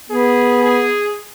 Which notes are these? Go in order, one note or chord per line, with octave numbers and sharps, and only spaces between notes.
B3 G#4
G#4